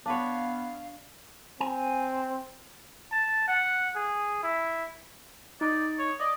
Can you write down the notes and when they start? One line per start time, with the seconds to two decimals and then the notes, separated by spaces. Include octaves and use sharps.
0.06 B3 D4 B4 C#5 F5
1.60 C4 G#5
3.12 A5
3.48 F#5
3.96 G#4
4.43 E4
5.61 D#4 D5
5.99 C#5
6.20 D5 D#5